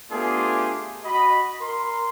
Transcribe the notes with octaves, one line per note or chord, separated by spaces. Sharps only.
A3 B3 D4 F4 G4 G#4
F#4 D#5 B5
A#4 C6